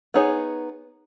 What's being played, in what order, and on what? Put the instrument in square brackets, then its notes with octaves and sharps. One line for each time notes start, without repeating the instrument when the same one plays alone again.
[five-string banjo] B3 D#4 G#4 C#5